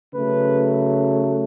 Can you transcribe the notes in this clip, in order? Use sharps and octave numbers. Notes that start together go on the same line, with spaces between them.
C#3 F#3 A3 B4